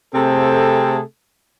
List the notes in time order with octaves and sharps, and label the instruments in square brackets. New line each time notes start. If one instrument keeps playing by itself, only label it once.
[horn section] C3 A3 C4 G#4 A4